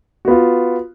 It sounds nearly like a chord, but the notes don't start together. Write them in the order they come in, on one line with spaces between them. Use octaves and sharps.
F#4 B3 F4